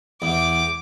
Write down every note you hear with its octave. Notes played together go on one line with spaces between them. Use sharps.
E2 D6